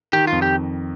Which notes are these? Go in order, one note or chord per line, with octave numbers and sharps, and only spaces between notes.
D#3 G4
F2 F4
G4